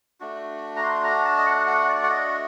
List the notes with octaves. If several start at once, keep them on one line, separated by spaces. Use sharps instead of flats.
A3 D4 F#4
A#5
C6
A#5
A5
D#5
F#5
F#5
D5
F#5
D#5